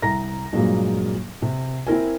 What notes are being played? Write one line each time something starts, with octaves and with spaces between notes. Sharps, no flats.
C2 A#5 A#6
G2 A#2 F#3 G#3 A#3
C3
C4 E4 A#4 G#5